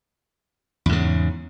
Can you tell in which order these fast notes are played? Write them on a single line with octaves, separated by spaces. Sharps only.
E2 G#2 C#3